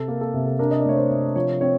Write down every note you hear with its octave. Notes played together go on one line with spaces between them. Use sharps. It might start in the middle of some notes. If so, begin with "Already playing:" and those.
Already playing: C3 A4
A#3
A4
C3
A4
D4 A#4
D#5
D5
A3 C#5
C5
C3
F3 C#5
C4 C#5